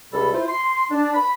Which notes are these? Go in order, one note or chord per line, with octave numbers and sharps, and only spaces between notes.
C#2 C3 G3 A4 B5
E4 F4 C5
C6
D4
B5